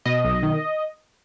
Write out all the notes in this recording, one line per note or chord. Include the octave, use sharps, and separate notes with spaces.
B2 D#5
B1
D#3